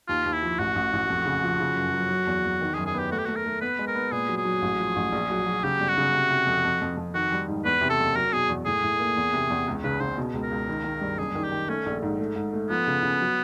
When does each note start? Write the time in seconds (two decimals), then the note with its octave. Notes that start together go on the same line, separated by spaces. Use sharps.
0.08 D#2 F4
0.25 D#2
0.33 E4
0.43 F3
0.59 A1 F#4
0.76 A1
0.93 A1
1.10 F2
1.26 C#3
1.43 F3
1.60 C#3
1.76 F#2
1.93 F#3
2.10 F#3
2.27 E2
2.44 E2
2.61 D#3
2.74 G#4
2.77 F#2
2.86 G#4
2.94 B3
2.99 G4
3.11 A3 F#4
3.18 G4
3.25 A3 F#4
3.36 A#4
3.45 A3
3.61 B3 B4
3.79 G#3
3.87 A#4
3.95 B3
4.12 A#2 G#4
4.29 F#3
4.37 G#4
4.45 F#3
4.62 A1
4.79 F3
4.96 A1
5.12 A#1
5.30 F#3
5.47 F#3
5.64 C#3 G4
5.80 G1
5.88 F#4
5.97 C#3
6.14 C3
6.30 C3
6.47 F2
6.65 F2
6.82 F2
6.97 F2
7.14 D#3 F#4
7.32 G3
7.48 G#2
7.65 E2 B4
7.81 C3
7.90 A4
7.99 F#1
8.16 F#3 A#4
8.33 B2 G#4
8.49 E2
8.66 A2 G#4
8.83 A2
9.00 A#3
9.17 E2
9.33 C3
9.50 E2
9.68 C#2
9.84 C#3 B4
10.00 C#3 C5
10.18 B2
10.34 C#2
10.43 A#4
10.51 C#2
10.69 D#3
10.84 D#3
11.01 G2
11.18 F#1 G#4
11.35 D#3
11.44 G4
11.52 D#3
11.68 A3 C#4
11.86 A#1
12.02 G#2
12.19 A3
12.36 G#2
12.53 A3
12.70 F3 B3
12.87 C#3
13.03 C#3
13.20 F#3